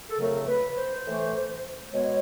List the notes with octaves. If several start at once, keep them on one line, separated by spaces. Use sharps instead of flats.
A4
F2 C#3 F#3 A3 A#4
B4
C5
A2 E3 A3
B2 G#3 B3 C#5